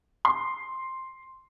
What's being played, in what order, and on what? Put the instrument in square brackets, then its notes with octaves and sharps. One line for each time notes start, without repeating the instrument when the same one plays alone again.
[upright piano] C6